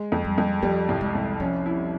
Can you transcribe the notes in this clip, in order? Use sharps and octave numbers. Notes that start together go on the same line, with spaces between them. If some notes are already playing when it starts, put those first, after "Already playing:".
Already playing: G#3
F2
G3
F2
F3 G3
C2
G#3
C2
F3 C#4
E4